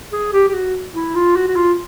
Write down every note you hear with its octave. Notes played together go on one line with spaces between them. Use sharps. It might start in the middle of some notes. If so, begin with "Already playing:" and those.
G#4
G4
G4
F#4
E4
F4
F#4
F#4
F4